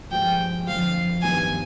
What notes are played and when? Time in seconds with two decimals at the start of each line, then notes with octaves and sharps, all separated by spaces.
0.11 G2 F3 G#3 G5
0.67 F2 D3 F3 F5
1.22 G2 D#3 B3 F4 G#5